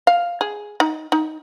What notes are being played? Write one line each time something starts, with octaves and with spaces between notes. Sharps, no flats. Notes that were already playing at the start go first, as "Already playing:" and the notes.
F5
G#4
D#4
D#4